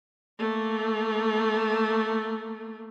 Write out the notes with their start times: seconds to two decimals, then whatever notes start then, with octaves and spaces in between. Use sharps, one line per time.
0.39 A3 A#3